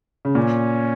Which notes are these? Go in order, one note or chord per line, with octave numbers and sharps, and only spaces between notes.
C#3
A#2 C#4